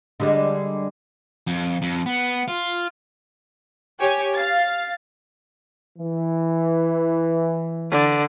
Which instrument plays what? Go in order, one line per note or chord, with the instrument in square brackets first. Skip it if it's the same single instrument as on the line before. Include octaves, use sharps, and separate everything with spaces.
[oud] D3 G3 G#3
[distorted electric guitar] F2
F2
B3
F4
[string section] G4 C#5 G#5
F5 A6
[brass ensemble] E3
[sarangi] D3